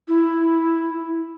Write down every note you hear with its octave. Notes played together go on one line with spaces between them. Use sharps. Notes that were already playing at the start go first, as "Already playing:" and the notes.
E4